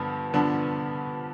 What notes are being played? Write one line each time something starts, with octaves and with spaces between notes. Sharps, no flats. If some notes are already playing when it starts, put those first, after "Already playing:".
Already playing: G2 D3 F3 B3
G2 D3 F3 B3 D4